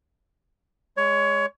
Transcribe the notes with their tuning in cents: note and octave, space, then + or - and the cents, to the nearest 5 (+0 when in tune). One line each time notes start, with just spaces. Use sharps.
G#3 +0 C#5 +20